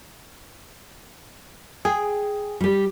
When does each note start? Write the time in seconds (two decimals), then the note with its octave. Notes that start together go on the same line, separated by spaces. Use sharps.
1.85 G#4 G5
2.61 G3 G4